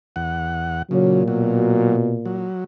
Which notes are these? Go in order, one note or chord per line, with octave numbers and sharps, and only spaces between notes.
E2 F#5
A#2 C#3 F#3
B2 F#3
F#3